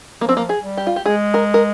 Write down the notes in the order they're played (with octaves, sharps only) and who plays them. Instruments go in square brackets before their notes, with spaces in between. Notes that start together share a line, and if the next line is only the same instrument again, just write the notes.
[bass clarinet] F3 [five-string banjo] A#3
[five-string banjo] C4
A#3
G#4
[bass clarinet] G3
[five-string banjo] G4
F4
G4
[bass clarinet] G#3 [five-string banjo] G#4
[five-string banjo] A#4
A#4